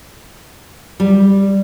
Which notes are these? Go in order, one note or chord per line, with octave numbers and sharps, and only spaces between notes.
G3